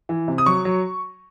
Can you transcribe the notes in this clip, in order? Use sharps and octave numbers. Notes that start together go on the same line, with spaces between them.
E3
C3
D#6
F#3 C#6
F#3